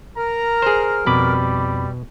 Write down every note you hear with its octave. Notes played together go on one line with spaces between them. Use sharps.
A#4 A#5
G#4 C5
F2 B2 G3 B5 D6